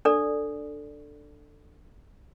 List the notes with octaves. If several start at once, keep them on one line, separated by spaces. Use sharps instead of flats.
D4 A4 D5